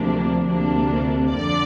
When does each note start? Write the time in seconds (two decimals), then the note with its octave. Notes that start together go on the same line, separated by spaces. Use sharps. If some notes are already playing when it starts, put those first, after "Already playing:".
Already playing: D2 C3 F3 A#3 D4
0.45 D2 C3 A#3 D4
1.33 F2 D3 D5